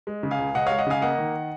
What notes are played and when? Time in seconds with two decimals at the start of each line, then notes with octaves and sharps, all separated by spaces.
0.07 G#3
0.23 C#3
0.31 F5 G#5
0.39 C#2
0.55 C#2 D#5 F#5
0.66 G#3 C#5 F5
0.78 D#5 F#5
0.87 C#3 F5 G#5
1.02 A#3 D#5 F#5
1.18 D#3